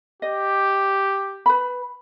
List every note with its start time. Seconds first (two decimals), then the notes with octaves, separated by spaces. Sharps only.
0.22 G4 D#5
1.46 B4 B5